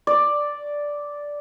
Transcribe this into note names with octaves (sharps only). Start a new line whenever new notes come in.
D5